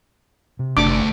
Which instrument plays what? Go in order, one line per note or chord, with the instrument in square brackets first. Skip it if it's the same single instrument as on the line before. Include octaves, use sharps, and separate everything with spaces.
[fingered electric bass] C3
[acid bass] F#1 [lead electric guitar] D2 A3 [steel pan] D4 D6